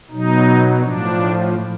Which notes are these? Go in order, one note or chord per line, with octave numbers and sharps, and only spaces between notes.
B2 F#3 D#4
A2 F3 D4